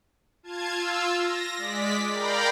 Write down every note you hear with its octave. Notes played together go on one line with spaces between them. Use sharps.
F4 A5 G#6
F4 E6
A#6
G#3 D5 B6
A#4 D5 F5 G5 A#5 B5